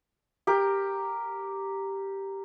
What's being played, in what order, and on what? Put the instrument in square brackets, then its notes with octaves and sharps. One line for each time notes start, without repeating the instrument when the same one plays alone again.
[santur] G4 A#4